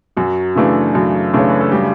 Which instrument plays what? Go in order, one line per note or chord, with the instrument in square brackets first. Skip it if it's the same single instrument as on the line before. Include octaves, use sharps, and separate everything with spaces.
[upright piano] F#2 [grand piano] F#3 F#4
[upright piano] C#3 E3 A3 D4
F#2
[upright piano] C#3 E3 A3 D4 [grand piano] C#5
[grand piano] B4
A4
G3 G4